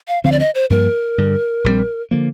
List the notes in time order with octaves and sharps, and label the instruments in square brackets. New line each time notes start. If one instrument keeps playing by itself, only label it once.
[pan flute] F5
[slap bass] D2 D3 F3 C4 [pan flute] F5
[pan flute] D5
D#5
C5
[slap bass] G2 F3 A#3 [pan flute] A#4
[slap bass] G2 D3 G3
A#1 A#2 G3 C4
D3 F3 A#3